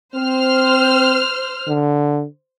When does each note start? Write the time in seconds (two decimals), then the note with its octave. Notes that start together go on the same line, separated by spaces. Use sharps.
0.15 C4 C5 F6
1.68 D3